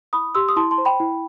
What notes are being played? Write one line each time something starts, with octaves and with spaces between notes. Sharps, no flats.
E4 B5 D#6
G4 C6 E6
D#6
E4 A5 C6
A5 C6
C5
G5 B5
E4